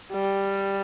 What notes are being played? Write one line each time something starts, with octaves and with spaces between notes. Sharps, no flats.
G3